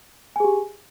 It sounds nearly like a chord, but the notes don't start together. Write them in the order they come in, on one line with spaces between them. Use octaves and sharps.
G#5 G#4 G4